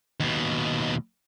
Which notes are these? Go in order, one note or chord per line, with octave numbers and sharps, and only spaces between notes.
D#2 B2